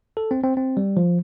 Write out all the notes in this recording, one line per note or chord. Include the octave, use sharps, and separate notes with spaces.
A4
C4
C4
C4
G3
F3